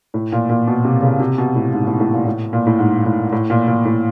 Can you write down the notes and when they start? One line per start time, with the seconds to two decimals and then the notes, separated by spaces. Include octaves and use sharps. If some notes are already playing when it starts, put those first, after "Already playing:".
0.14 A2
0.32 A#2
0.50 A#2
0.67 B2
0.85 C3
1.02 C#3
1.20 C3
1.38 B2
1.56 A2
1.73 G#2
1.87 A2
2.00 A2
2.13 A#2
2.26 A2
2.53 A#2
2.67 A2
2.79 G#2
3.06 A2
3.32 A2
3.50 A#2
3.68 A#2
3.85 A2